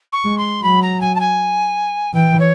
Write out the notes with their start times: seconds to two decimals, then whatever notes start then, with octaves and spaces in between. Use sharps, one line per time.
0.12 C#6
0.25 G#3
0.37 C6
0.63 F#3 B5
0.82 A#5
1.00 G#5
1.15 A5
1.20 G#5
2.14 E3 G5
2.39 C#5